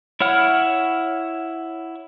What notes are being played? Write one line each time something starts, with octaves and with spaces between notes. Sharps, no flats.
E4 C#5 F#5 F6